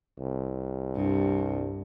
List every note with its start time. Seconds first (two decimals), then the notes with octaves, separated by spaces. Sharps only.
0.18 C2
0.95 G2